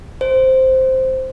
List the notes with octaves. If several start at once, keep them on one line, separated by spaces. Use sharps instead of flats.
C5